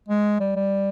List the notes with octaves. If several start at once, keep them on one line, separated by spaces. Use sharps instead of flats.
G#3
G3
G3